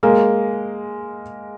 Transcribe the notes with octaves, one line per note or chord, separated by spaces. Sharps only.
G#3 A#3